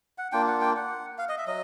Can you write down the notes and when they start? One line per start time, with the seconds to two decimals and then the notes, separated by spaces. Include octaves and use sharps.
0.18 F#5
0.32 A#3 D4 F4 G5
0.48 F#5
0.61 G5
0.76 F#5
1.18 F5
1.29 D#5
1.38 E5
1.47 F#3 D#5